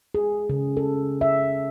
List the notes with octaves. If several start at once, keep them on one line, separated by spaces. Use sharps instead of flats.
G#4
C#3
A4
E5